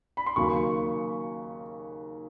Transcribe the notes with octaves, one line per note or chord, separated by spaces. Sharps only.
B5
C6
D#2 C#3 F#3 A#3 C#6